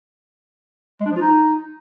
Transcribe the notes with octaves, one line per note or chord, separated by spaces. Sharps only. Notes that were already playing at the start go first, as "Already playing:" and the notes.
G#3
D4
F3
F4
D#4